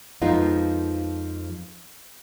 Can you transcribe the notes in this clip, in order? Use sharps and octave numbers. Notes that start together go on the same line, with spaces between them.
F2 F3 G#3 B3 D#4 F4